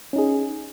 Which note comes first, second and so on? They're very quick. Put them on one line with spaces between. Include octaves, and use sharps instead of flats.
C#4 D#4 G#4